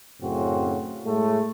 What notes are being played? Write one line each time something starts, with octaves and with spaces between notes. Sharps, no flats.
F#2 A2 C#3 C4 F#4
A2 G#3 A3